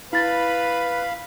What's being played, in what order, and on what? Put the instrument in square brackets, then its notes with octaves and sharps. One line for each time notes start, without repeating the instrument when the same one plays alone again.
[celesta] E4 A6 [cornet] B4 [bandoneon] F5 B5